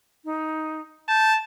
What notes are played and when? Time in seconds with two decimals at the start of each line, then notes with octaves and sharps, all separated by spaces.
0.24 D#4
1.08 A5 G6